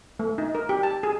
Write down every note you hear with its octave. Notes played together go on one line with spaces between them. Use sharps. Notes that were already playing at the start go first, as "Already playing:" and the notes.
A3
D#4
A#4
G4
A5
G#4